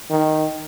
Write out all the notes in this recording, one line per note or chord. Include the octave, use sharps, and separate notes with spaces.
D#3